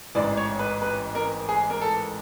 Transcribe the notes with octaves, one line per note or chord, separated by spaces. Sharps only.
A1 G#2 E3 D5
C#5
B4
B4
A#4
G#4
A#4
A4